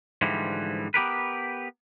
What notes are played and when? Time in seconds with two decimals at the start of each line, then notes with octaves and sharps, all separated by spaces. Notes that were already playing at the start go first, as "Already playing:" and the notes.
0.22 G#2 D3 E3 F3 G3
0.94 B3 G4 A#4 B4